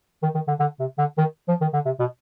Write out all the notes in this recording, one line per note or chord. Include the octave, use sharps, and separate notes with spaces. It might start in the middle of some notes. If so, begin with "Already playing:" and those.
D#3
D#3
D3
D3
C3
D3
D#3
F3
D#3
D3
C3
B2